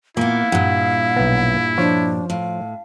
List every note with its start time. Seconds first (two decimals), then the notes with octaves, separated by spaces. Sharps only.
0.17 A#2 A#3 B3 E4 F5
0.52 G2 A#2 F#5
1.16 B1 B3
1.78 F3 D4 F4 C#5
2.30 A2 F5